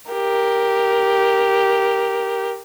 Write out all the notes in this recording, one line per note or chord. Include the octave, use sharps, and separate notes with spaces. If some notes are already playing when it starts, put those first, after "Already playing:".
G4 A#4